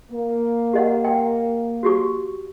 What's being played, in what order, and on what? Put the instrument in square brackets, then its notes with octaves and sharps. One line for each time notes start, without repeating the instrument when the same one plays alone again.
[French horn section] A#3
[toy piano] G4 D#5 F#5
F#5 G5
F#4 G4 C#6